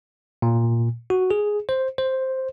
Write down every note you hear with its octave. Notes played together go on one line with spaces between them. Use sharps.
A#2
F#4
G#4
C5
C5